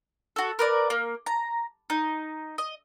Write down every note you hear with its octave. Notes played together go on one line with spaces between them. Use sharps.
F#4 A4
A#4 B4 D5
A#3
A#5
D#4
D#5